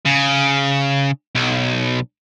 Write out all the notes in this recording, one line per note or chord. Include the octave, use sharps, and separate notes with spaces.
C#3
B1